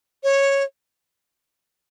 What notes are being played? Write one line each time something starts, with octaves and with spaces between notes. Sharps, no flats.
C#5